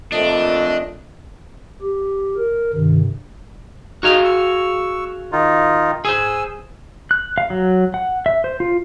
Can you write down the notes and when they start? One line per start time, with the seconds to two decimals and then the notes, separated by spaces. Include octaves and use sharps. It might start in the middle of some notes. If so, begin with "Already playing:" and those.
0.12 F2 A#2 A3 D4 D#5
1.82 G4
2.37 A#4
2.74 G2 C3 D#3
4.03 D#4 F#4 G#4 F5
4.24 C#6 E6
5.32 D#3 D#4 F4
6.05 G#4 C5 G#5 E6
7.11 F#6
7.38 F5
7.50 F#3
7.94 F#5
8.26 E5
8.44 C5
8.60 F4